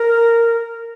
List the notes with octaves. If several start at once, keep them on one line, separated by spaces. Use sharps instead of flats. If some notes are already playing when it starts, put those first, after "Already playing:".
Already playing: A#4